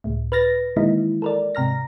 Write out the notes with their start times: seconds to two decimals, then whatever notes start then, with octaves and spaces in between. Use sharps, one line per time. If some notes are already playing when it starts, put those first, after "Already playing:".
0.04 C#2 A2
0.32 B4 F6 A6 A#6
0.76 D#3 E3 G#3 A#3 D#4 E4
1.22 A4 A#4 D5
1.55 G#2 C3 A#5 F6 A#6